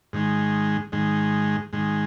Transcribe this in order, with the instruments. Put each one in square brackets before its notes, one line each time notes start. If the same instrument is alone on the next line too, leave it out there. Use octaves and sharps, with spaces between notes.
[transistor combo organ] G#2 D#3 G#3
G#2 D#3 G#3
G#2 D#3 G#3